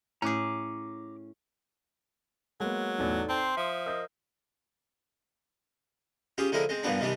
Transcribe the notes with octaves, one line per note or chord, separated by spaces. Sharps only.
A2 C#4 G#4 A#5 D6
F#3 G#3 A#3 B3
B1 E2 A2 D#4 A4 D5
C4 A5 C6
F3 E5 D#6
A#4 D#5 E6 G6
C#4 F4 G4 G#4
D3 F3 G#3 E4 A#4
G#3 C4
G2 A#2 E3 F3 B3 D4
C3 D#3 E3 G3 D4